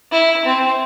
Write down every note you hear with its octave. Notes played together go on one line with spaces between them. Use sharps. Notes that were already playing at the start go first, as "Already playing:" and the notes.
E4
C4